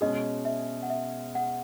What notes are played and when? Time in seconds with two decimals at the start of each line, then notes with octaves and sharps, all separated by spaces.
0.01 B2 G#3 C#4 G#4 D#5
0.45 E5
0.83 F#5
0.90 E5
1.35 F#5